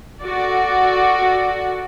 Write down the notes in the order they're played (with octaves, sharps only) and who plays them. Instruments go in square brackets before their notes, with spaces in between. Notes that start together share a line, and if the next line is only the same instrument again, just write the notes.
[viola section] F#4 A4 D5